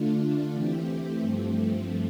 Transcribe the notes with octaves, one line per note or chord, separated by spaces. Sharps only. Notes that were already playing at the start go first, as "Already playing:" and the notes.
Already playing: D3 A3 D4 F4
E3 A3 C4 G4
G2 F3 A3 C4